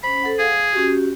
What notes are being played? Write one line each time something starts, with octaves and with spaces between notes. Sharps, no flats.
C#4 C5 B5
A4 C5 F#5
G#4 F5
C#4 F#4 G4